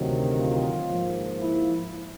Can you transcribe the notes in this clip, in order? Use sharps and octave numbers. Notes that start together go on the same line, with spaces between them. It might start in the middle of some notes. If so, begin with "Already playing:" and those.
Already playing: D2 C3 D#3 F#3
F4
G#2 F3 A#3
E4